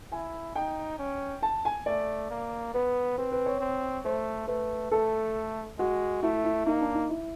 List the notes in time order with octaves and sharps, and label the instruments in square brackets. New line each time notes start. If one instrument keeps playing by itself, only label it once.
[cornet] E4 [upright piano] G#5
[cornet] D#4 [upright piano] G5
[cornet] C#4
[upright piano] A5
G#5
[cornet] A3 [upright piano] D5
[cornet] A#3
[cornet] B3 [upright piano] B4
[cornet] C4 [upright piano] B4
[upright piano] B4
C#5
[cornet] C4
[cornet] A3 [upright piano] C5
[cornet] A3 [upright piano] B4
[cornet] A3 [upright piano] A4
[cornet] G#3 [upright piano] F#4
[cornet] A3 [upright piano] E4
[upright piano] E4
[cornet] A#3 [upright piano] D#4
[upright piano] D4
D#4
E4